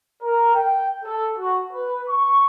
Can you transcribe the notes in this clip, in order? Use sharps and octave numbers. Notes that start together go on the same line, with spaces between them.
A#4
G5
A4
F#4
B4
C#6